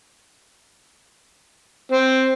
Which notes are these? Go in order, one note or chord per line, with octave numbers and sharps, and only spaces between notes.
C4